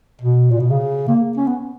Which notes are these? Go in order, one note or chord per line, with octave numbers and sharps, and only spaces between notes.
B2
A#2
B2
C#3
A#3
C#4
B3